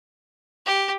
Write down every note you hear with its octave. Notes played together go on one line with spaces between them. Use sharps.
G4